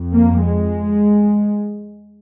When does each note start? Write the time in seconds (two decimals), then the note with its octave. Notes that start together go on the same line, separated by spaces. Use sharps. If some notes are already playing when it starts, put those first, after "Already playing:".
Already playing: F2
0.16 A#3
0.44 G#3